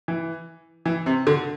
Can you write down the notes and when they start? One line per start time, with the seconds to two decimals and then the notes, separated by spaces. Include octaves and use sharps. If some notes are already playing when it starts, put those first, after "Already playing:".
0.08 E3
0.86 E3
1.06 C3
1.27 D3